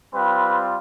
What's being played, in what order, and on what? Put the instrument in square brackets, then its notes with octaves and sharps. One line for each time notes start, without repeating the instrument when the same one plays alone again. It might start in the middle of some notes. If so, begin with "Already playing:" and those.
[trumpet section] G3 C4 F4 B4